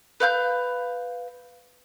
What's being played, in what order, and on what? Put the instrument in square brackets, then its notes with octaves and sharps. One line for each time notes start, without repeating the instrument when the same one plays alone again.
[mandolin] B4 F5 F#6 G6